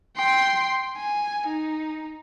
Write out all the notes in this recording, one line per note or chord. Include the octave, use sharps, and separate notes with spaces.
G5 C6
G#5
D#4